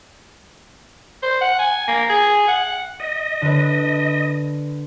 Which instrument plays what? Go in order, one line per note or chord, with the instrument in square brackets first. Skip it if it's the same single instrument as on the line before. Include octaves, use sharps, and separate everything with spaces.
[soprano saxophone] C5
F#5
G#5
A#3
G#4
F#5
[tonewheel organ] D#5
[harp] D3 B4